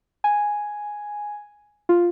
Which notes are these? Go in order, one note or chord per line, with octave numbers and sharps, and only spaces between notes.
G#5
F4